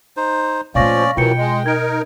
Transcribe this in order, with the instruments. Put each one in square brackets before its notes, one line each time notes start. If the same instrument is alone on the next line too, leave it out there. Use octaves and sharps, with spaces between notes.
[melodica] D#4 C5
[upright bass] A#2 A3 [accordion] F3 [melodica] C#4 D5 [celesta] F5 C#6 A#6
[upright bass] B2 [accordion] D#3 E3 F#3 [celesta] F4 C#7 [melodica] G5
[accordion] G#3
[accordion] D#4 A#4 [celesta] G#6 D7